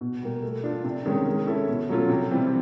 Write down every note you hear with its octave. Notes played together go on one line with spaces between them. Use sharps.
B2
G3 A#3
A3
D4 F4
C3
D#3 G#3 C#4
G#3
C#4 E4 A4
B2
F#3 A3 C#4 F4
C3
E3 G3 C4